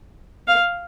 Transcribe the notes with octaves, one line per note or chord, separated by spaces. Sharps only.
F5